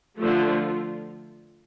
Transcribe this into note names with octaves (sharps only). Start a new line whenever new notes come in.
D3 F3 A3 F4